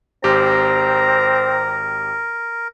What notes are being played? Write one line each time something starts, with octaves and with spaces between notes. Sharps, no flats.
G#1 C4 G4 A#4 A#5